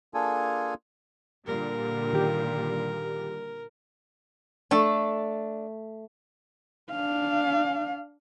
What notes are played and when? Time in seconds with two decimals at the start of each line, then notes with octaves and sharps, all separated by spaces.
0.14 A#3 D4 F4 G#4 A4 G#5
1.46 A#2 D3 G3 A#4
2.13 D#3 G4
4.71 A3 D4 A4
6.91 D4 F5